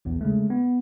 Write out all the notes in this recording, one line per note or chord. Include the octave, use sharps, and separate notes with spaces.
A#1 E2
C#3 G#3 A3
B3